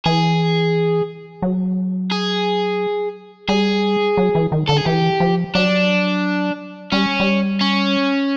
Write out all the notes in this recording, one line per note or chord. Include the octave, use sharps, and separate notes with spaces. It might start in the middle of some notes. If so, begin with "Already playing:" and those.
E3 G#4
F#3
G#4
G3 G#4
F#3
E3
D#3
D3 A4
G#4
E3 G4
F3
F#3 D4
G3 C#4
G3
C#4